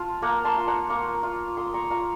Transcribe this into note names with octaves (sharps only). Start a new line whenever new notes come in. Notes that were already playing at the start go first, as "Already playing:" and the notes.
Already playing: F4 A5
A#3 F#5 A#5
A5 C6
F4
F#5 A#5
A#3 A#5 C#6
F4
A#3 C6 D#6
A#5 C#6
F4 A#5 C#6